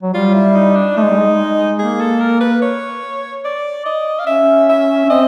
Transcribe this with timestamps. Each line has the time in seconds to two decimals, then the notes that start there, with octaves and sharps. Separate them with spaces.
0.02 F#3
0.14 G3 F4
0.34 E4
0.55 D#4
0.75 D4
0.97 A3 D#4
1.03 G#3
1.10 G3
1.17 G#3
1.79 A#3 G#4
2.00 A4
2.20 A#4
2.41 B4
2.62 C#5
3.45 D5
3.86 D#5
4.19 F5
4.27 C#4 E5
4.69 E5
5.05 C#4
5.09 C4 D#5